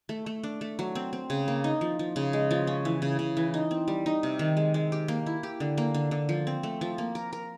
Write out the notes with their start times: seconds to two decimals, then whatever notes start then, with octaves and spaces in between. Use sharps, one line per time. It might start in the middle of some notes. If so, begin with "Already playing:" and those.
0.09 A3
0.26 A3
0.43 D4
0.61 A3
0.79 F#3
0.95 C4
1.13 C4
1.30 C#3
1.48 A#3
1.64 D#4
1.81 F3
1.99 F3
2.16 C#3
2.33 G#3
2.51 F3
2.67 C#4
2.85 E3
3.02 C#3
3.19 C#3
3.37 E3
3.54 D#4
3.71 C4
3.88 G3
4.06 D#4
4.23 C3
4.39 D#3
4.57 G#3
4.74 G#3
4.92 G4
5.08 A#3
5.26 E4
5.43 G4
5.60 D3
5.78 A#3
5.94 D3
6.11 D3
6.29 F3
6.47 C4
6.63 A3
6.81 F3
6.98 A#3
7.15 A#4
7.33 A#4